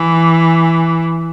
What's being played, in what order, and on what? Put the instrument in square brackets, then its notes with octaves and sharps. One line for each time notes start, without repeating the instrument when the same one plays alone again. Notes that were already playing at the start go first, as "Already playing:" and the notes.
Already playing: [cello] E3